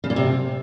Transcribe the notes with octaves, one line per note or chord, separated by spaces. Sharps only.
C#3
A#2
C3